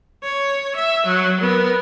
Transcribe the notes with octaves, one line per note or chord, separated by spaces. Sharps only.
C#5
E5
F#3
B3 A#4